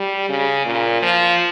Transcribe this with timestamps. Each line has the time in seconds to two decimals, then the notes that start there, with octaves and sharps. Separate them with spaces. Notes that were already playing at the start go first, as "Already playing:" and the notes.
Already playing: G3
0.30 C#3
0.66 A#2
1.02 F3